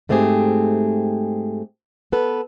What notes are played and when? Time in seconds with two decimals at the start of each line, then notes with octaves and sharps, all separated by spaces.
0.09 G#2 A3 C4 G4 G#4
2.12 B3 A4 B4